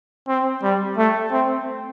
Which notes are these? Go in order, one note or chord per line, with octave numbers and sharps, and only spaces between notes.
C4
G3
A3
C4